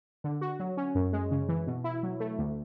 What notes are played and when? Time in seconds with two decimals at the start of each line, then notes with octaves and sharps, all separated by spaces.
0.24 D3
0.41 F#4
0.60 F#3
0.77 C#4
0.95 F#2
1.13 G#3
1.31 C#3
1.49 E3
1.67 B2
1.84 E4
2.03 F#3
2.20 A3
2.39 D2